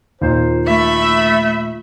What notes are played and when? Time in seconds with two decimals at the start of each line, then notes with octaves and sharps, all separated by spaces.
0.21 D#2 A#2 C5
0.67 A3 E5 B5